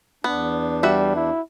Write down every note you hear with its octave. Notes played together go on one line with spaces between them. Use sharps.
E2 B3 D4
G3 F#4 E5
E4